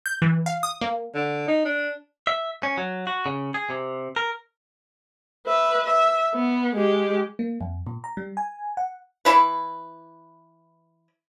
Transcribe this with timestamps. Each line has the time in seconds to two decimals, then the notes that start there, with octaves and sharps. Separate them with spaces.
0.06 G6
0.22 E3
0.46 F5
0.63 D#6
0.81 A#3
1.14 D3
1.48 D#4
1.65 D4
2.27 E5
2.63 C#4
2.78 F#3
3.07 F#4
3.26 C#3
3.54 G#4
3.70 C3
4.16 A#4
5.47 B4 E5
5.85 E5
6.35 B3
6.76 G#3 G4
7.39 A#3
7.61 F2
7.87 A#2
8.04 A#5
8.17 G3
8.37 G#5
8.77 F#5
9.25 E3 E4 B4